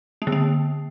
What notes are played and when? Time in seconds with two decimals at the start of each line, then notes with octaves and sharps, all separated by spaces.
0.22 A#3
0.27 D3
0.32 A#3